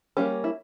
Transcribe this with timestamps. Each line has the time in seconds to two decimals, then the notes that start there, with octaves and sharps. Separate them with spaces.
0.17 G3 A#3 C#4 G4
0.44 E4